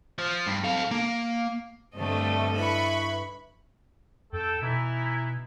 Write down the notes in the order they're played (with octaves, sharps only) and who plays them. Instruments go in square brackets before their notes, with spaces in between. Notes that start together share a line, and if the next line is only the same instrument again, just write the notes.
[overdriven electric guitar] F3
G2
A4 F5
A#3
[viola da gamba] G2 A4 D#5 [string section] D3 A3 C4
[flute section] E4 B4 E5 [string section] B5 C#6
[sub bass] F2 [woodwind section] A4 G5
[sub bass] B2 [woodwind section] E3 D#4 E4